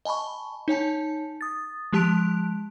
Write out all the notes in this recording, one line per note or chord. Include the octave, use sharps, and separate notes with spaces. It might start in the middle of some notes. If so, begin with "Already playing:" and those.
D#5 G#5 A5 B5 C#6
D#4 C#5 G#5 A5
D#6 A6
F3 G#3 G4 A5 F#6 D7